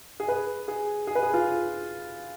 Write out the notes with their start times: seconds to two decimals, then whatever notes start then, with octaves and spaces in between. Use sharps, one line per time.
0.20 G#4
0.28 B4
0.68 G#4
1.07 G#4
1.15 B4
1.23 G#4
1.34 F4